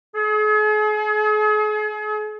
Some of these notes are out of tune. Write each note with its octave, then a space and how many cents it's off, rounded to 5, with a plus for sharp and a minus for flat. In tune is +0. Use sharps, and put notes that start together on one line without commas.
G#4 +40